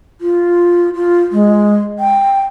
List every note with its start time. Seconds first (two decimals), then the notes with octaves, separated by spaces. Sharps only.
0.21 F4
0.94 F4
1.32 G#3
1.99 G5